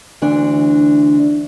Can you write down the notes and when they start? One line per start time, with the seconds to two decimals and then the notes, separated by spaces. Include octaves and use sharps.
0.22 D2 E3 D4